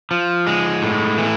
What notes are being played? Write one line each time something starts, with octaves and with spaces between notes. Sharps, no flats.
F3
G#3
A2
E3